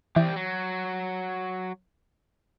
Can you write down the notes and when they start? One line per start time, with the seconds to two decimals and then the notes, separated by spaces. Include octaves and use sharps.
0.16 E3 G4 C5 D5
0.36 F#3